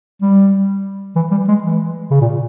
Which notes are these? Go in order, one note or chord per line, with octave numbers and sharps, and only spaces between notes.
G3
E3
G3
G#3
E3
C#3
A#2